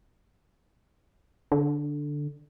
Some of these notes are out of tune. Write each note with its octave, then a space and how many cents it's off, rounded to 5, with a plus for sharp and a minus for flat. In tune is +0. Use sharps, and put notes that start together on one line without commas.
D3 +0